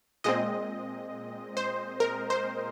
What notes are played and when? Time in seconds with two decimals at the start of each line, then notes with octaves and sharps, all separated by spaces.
0.24 A#2 G#3 C4 D#5
1.57 C5
2.00 A#4
2.30 C5